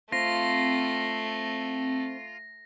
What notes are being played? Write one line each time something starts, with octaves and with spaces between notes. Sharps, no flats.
A3 C4 F4 A#6